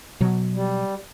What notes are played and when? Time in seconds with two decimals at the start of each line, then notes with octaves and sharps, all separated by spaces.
0.20 B2 F#3
0.54 G3